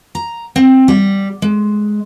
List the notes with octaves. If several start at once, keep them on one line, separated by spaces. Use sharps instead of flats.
A#5
C4
G3
G#3